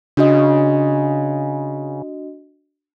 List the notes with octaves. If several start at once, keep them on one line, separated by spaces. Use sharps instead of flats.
C#3 D4 F#4 D#5